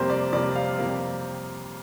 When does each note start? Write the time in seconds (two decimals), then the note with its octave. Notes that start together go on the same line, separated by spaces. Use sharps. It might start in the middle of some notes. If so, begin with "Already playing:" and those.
Already playing: F2 C3 G3 A#3 C5
0.10 D5
0.33 F2 C3 G3 A#3 D5
0.55 F5
0.79 F2 C3 G3 A#3